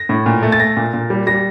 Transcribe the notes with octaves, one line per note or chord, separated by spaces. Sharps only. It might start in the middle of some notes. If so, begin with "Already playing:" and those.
Already playing: A#6
A2
A#2
A3
A6
A3 A#6
A#2
A#2
G3
G3 A#6